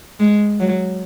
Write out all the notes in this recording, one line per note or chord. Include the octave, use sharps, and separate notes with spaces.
G#3
F#3